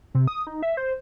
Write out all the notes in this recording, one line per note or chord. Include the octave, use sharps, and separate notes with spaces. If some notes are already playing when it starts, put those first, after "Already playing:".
C3
D#6
D#4
E5
C5